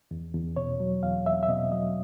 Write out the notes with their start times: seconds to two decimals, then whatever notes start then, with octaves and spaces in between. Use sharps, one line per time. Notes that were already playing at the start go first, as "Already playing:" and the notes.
0.11 E2
0.34 E2
0.56 B2 C#5
0.80 F#3
1.03 E2 F5
1.26 E2 E5
1.43 E5
1.49 B2 D#5
1.72 F#3 D#5